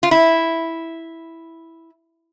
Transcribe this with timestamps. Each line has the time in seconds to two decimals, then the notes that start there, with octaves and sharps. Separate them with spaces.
0.03 F4
0.11 E4